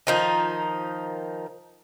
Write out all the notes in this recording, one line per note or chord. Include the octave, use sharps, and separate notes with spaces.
D#3 F3 D#4